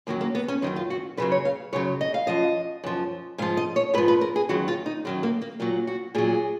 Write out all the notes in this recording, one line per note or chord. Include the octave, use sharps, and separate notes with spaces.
F#2 D#3 F#3 A#3
A#3
B3
C#4
F#2 D#3 F#3 D#4
F4
F#4
F#2 C#3 F#3 B4
C#5
F5
F#2 C#3 F#3 C#5
D#5
F5
F#2 F3 D#5
F#2 F3
G#2 F3 F5
D#5
C#5
G#2 F3 B4
B4
A#4
G#4
F#2 D#3 F#3 F#4
F4
D#4
F#2 D#3 F#3 D#4
A#3
A#3
A#2 F#3 A#3
F#4
A#2 F#3 G#4